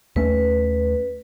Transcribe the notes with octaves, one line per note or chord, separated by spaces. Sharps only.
D#2 A3 C#4 B4